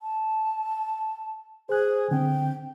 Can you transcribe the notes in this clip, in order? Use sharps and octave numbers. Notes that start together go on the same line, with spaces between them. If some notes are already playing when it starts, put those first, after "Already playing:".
A5
G#4 C5 F#6
D3 C4 G5